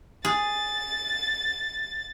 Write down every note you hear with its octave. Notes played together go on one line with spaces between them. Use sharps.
G#4 A6